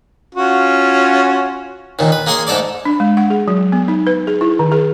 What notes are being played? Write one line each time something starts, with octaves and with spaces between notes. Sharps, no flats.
C#4 F4 F#4
D#2 A#2 D#3
B4
A#3 G#4 C#5 G#5 C6
G#2 A3 A4 D5 D6
D4
G#3
F#5
G#4
F#3
B3
D#4
B4
G#4
E4
D#3
G#4